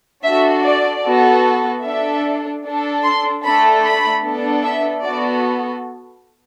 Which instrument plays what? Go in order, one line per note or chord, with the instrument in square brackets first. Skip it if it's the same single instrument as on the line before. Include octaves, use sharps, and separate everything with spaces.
[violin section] D4 F#4 A4 E5
D5
B3 F#4 A4
D4 A4 E5
D4 A4
C6
A3 D4 A4 B5
B5
B3 D4 A4
E5
B3 F#4 A4 D5